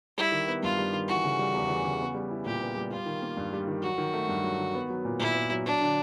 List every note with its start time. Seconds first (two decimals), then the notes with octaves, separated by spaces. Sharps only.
0.17 G3 E4
0.32 D#3
0.47 B3
0.63 G2 F4
0.79 G3
0.93 D#3
1.08 E3 F#4
1.24 C#3
1.39 G3
1.54 E2
1.69 E3
1.85 C#3
2.00 B3
2.15 G3
2.31 E4
2.45 A#2 G4
2.61 B3
2.76 G3
2.91 G3 F4
3.06 D#3
3.22 A#3
3.37 G2
3.53 G3
3.67 D#3
3.83 F#3 F#4
3.98 D#3
4.13 A3
4.29 G2
4.44 F#3
4.59 D#3
4.75 B3
4.90 F#3
5.05 A#2
5.19 A#2 E4
5.34 B3
5.51 F#3
5.66 F#3 D4
5.81 D3